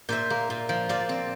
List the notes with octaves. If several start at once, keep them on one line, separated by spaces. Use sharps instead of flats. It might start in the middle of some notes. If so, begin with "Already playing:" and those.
A#2 C5 E5
A#3
A#2
F3
A#2 D5 F5
C4